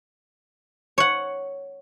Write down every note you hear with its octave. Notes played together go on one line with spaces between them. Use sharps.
C#5 F#5